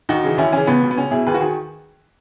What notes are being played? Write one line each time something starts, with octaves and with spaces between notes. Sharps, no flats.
D#2 D#4 F#4
C#3 E3
D#2 C#4 E4
C#3 E3 C#4
C#2 B3
B2
B3
C#2 C#4
B2 E4 G#4
D#2 G#4 B4
F#4
D#3 G#4